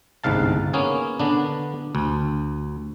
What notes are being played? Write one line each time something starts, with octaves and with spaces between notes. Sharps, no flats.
G1 C2 G#2 F5 A5
A#3 B3 C#4 G#4
D3 B3 D4
D2